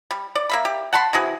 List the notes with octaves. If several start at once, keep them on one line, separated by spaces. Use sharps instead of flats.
G3
D5
A#3 E5 B5
G4
F#5 A5 B5 C6
C3 E3 F#4 G#4